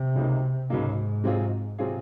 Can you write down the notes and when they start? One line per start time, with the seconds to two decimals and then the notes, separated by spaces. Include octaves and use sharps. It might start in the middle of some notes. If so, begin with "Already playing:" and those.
Already playing: C3
0.15 C#2 C#3 F#3 A#3 D#4
0.70 C#2 G#2 C#3 F#3 A#3 D#4
1.24 C3 F#3 C4 F4 G#4
1.79 C3 F#3 C4 F4 G#4